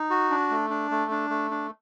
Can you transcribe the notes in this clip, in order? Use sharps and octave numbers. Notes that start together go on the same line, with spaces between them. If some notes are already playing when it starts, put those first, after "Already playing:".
Already playing: D#4
F#4
D4
A3
D4
A3
D4
A3
D4